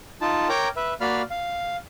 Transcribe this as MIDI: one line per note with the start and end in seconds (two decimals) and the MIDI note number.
0.21 0.48 63
0.21 0.48 65
0.21 0.48 81
0.49 0.68 70
0.49 0.68 73
0.49 0.68 79
0.49 0.68 82
0.49 0.68 86
0.76 0.94 71
0.76 0.94 76
1.01 1.22 58
1.01 1.22 66
1.01 1.22 74
1.01 1.22 77
1.01 1.22 83
1.01 1.22 89
1.30 1.76 77